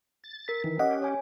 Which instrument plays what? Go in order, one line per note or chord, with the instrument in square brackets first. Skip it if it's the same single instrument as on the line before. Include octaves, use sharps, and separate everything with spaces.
[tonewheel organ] A6
[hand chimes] A#4 B6
[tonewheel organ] D#3 E3
[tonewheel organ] C#4 G4 [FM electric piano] D#5 F#5
[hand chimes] C#5 G#5